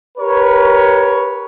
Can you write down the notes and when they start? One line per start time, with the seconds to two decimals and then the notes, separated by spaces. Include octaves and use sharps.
0.18 G4 A#4 B4 C#5